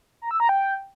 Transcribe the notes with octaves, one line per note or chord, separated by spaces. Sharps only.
A#5
E6
A#5
G5